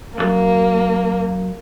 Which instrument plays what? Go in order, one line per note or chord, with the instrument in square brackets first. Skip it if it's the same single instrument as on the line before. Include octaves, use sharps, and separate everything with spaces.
[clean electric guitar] B1 F#2 [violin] A#3